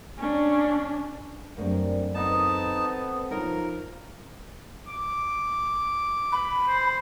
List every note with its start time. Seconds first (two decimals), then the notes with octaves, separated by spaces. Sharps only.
0.18 C#4 D4
1.57 F#2 G3 A3 C4 D4 A#4
2.15 B3 C4 D#4 A4 A5
3.31 F3 D#4 A#4 C#5 D#5
4.88 D6
6.32 B5
6.68 C5